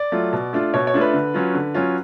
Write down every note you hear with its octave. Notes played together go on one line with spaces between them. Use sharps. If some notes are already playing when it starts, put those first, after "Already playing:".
Already playing: D5
F#3 A3 F4
B2
A3 D4 F4
B2 C#5
C#5
A3 D4 F4
B4
D3
F#3 C#4 F4
D3
F#3 C#4 F4